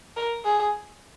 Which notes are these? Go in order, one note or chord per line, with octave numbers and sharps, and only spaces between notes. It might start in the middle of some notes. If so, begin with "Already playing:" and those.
A#4
G#4